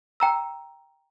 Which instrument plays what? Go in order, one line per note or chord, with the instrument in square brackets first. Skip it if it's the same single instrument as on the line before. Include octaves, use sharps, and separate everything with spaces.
[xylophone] G5 A#5 E6